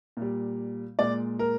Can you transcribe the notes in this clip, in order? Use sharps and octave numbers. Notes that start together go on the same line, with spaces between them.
A#2 G3
A#2 G#3 D5
A#4